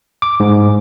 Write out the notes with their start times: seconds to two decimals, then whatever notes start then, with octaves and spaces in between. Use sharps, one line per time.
0.22 D6
0.40 G#2